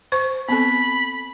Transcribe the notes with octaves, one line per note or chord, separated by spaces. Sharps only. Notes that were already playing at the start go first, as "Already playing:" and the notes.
C5 C#6
B3 C4 A4 B5